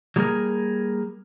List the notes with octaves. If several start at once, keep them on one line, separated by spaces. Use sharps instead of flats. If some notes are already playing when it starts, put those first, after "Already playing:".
F#3 G3 A#3 F#4 G#4 A#4